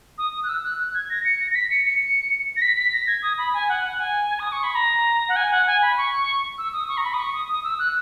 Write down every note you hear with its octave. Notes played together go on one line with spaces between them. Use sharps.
D#6
F#6
E6
F#6
F#6
G#6
A#6
C#7
A#6
A#6
B6
C#7
C#7
A#6
B6
B6
A#6
G#6
D#6
B5
G#5
F#5
F#5
G#5
D#6
C#6
B5
A#5
F#5
G#5
F#5
G#5
B5
C#6
E6
D#6
C#6
A#5
B5
D#6
C#6
D#6
D#6
E6
F#6